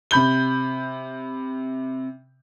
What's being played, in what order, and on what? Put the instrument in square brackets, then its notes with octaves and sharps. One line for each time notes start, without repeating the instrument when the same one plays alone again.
[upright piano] C3 B5 G6 G7